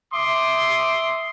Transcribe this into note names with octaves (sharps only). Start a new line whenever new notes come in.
E5 C6 D6 D#6